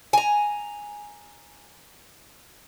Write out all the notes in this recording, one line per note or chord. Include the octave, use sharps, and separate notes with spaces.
G#5 A#5